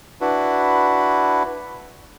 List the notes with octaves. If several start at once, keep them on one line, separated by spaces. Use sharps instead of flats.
D4 E4 F#4 B4